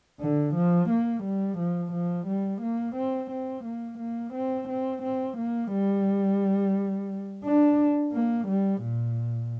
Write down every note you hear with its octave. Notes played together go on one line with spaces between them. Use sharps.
D3
F3
A#3
G3
F3
F3
G3
A#3
C4
C4
A#3
A#3
C4
C4
C4
A#3
G3
D4
A#3
G3
A#2